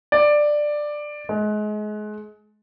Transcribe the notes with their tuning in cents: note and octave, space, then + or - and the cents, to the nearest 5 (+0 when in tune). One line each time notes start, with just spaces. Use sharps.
D5 +10
G#3 +30